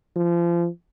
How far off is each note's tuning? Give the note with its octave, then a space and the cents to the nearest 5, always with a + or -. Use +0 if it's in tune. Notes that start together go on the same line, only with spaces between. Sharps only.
F3 -30